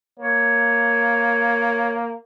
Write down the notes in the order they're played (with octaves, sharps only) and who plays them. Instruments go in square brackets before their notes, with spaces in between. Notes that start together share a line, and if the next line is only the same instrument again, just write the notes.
[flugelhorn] A#3 [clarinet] C#5